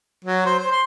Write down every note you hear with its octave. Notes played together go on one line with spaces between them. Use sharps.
F#3
C5
C5
C6